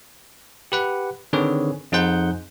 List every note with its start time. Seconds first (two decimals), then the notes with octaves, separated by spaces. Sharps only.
0.72 G4 B4 F#5
1.33 D3 D#3 C4 G#4 B4 C#5
1.92 F2 D#4 G#4 C5 F#5 G6